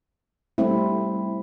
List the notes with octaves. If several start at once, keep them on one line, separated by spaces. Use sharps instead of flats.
G3 A3 C4 E4